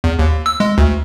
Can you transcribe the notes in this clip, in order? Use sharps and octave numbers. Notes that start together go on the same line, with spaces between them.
E2
D#2
E6
G#3
D2